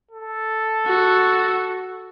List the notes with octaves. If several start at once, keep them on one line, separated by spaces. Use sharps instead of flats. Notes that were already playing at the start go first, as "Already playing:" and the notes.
A4
F#4